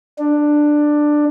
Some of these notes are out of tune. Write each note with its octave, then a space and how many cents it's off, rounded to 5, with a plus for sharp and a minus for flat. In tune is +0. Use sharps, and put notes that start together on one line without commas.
D4 +10